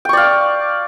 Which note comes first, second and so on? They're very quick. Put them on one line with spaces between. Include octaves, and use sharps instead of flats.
G5 C#6 D5 F5